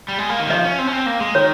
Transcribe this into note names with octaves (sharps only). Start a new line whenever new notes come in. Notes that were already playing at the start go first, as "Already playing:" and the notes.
G3
G#3
A#3
D#3
G3
F3 D#5
C#4
C4
C#4
C4
A#3
G#3
D#3 C#5